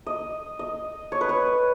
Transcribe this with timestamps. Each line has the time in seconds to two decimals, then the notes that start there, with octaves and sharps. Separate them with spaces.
0.06 D#5
0.59 D#5
1.12 C#5
1.21 B4
1.29 C#5